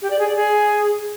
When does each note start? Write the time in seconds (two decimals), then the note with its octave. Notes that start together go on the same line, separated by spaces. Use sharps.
0.01 G4
0.10 D5
0.18 G#4
0.27 D5
0.35 G#4